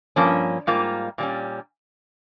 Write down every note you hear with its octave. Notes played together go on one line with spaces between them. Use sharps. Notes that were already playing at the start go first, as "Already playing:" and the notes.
G2 F3 A#3 C#4
G#2 G3 A#3 F4
A#2 G3 C#4